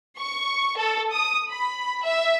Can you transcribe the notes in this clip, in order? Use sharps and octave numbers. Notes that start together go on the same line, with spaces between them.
C#6
A4
D#6
B5
E5